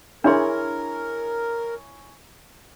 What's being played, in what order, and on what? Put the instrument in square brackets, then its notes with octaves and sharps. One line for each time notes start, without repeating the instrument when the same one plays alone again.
[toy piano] D4 C6 [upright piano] E4 G#4 C#5 [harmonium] A#4